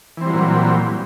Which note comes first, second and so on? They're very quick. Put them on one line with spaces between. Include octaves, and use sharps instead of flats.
E3 C4 G3 F#3 A#2